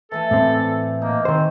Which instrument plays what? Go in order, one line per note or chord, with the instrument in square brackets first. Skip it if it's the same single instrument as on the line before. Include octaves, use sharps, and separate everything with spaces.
[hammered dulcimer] E3 A3 G#5 [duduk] A4
[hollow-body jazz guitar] A2 C4 [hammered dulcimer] D5
[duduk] A#3 [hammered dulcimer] D#4
[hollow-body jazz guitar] D#3 C5 [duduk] C4